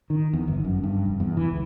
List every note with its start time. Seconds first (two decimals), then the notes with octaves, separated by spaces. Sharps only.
0.10 D#3
0.33 E2
0.48 G1
0.64 F#2
0.83 G2
1.05 F1
1.20 E2
1.37 E3
1.51 C#2